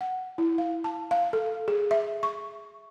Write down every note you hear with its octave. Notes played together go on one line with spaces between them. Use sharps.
F#5
E4
F5
A5
F5
A4
G#4
E5
C#6